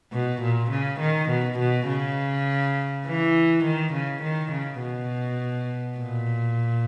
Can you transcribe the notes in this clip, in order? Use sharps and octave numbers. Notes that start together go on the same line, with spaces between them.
B2
A#2
C#3
D#3
B2
B2
C#3
E3
D#3
C#3
D#3
C#3
B2
A#2